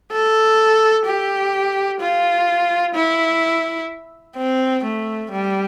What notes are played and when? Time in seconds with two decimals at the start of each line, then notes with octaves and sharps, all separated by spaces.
0.12 A4
1.06 G4
2.00 F4
2.95 E4
4.37 C4
4.84 A3
5.31 G3